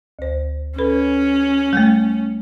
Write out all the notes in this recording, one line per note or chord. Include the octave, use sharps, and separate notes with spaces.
D2 C5
C#4 A4 B4 B5
G3 A3